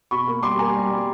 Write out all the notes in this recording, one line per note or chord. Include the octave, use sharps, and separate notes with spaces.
B2 B5 C#6
A#3
G3 C6 D6
A#3 G#5 A#5
G3
G3